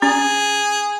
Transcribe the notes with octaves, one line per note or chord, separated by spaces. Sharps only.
C#4 G#4